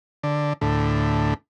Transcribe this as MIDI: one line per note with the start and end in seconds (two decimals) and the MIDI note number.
0.23 0.53 50
0.61 1.34 38
0.61 1.34 45